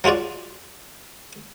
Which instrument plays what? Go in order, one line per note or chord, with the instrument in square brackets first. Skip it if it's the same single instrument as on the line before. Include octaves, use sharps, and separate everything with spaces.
[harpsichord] F#3 G#3 F4 F#4 D5